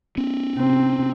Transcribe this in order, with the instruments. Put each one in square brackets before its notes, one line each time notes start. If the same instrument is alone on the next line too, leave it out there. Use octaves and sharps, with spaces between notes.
[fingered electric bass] B3 C#4
[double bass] C3 C4